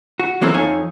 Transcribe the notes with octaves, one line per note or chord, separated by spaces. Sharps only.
F#4
E3 F#3 A#3 C4 E4 A4
F2 D#4 C#5 F5 G#5